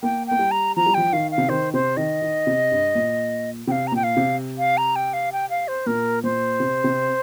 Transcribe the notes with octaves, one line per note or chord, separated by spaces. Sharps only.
A#3 G5
A#3 G5
G3
A#5
F3 A#5
G3
F3 G5
D#3 F5
F5
C3
D#3 C5
C3 C5
D#3 D#5
D#3
C3
G2
A#2
C3 F5 G5
A#5
A#2 G5
F5
C3
F5
A#5
G5
F5
G5
F5
C5
A#2 A#4
A#2 C5
C3
C3